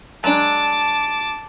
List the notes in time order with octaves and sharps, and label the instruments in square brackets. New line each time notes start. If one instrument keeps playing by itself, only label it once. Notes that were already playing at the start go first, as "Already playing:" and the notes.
[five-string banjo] F#3 G#3 D4 [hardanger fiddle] A5 D6